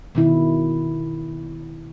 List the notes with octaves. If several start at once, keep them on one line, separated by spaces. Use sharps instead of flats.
B2 D#3 E4